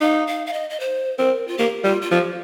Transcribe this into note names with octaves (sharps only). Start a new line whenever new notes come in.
D#4 F5
F5
F5
D#5
D#5
C5
C4 A#4
F4
A#3 G4
G3 F4
F4
F3 G4